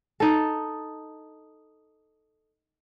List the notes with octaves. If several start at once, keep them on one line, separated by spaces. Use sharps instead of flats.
D#4 A4